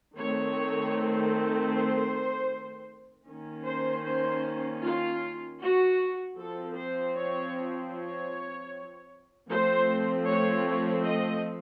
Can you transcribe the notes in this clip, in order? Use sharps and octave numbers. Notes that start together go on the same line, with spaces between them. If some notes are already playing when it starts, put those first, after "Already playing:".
D#3 A3 C4 C#5
C5
D#3 A#3 C#4
C5
C5
F4
F#4
F3 C4 A4
C5
C#5
C#5
F3 A3 C4 C5
C#5
C#5
D#5